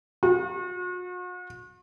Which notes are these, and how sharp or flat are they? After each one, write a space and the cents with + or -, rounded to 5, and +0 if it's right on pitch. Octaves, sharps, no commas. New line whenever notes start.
F#4 -45